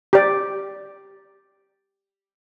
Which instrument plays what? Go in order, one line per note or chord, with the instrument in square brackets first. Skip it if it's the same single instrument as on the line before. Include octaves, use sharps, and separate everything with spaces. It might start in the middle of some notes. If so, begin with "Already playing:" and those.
[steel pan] G4 D5